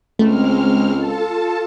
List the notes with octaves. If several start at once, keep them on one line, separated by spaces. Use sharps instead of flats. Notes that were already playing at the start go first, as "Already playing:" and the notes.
C#2 G#3 A3 C4 F6
F4 A4 A5